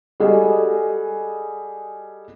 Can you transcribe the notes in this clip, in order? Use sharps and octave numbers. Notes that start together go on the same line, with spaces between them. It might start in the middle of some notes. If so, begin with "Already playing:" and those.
G3 F#4 G#4 A4 D#5 G#5